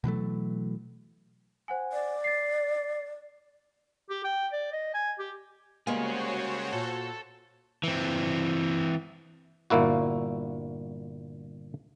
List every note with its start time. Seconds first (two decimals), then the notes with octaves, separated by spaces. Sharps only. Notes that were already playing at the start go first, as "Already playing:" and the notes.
0.04 B2 E3 F#3 A3
1.68 C5 F#5 G#5
1.92 D5
2.24 A6 C7
4.10 G4
4.24 G5
4.52 D5
4.73 D#5
4.94 G#5
5.19 G4
5.87 G3 G#3 A#3 C#4 F#4 G#4 C5 C#5
6.73 A#2 A4 A5
7.83 E3 C4
9.70 G1 A#2 A#3 E4 F#4